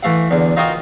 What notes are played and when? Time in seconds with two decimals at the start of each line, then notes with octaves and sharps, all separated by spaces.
0.03 E3 A3 F5 F#5
0.31 E2 D3
0.57 D#4 F4 F#4 A#4 G5 D#6